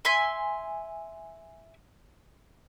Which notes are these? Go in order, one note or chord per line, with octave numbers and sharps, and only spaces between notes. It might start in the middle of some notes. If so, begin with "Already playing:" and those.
E5 G#5 C6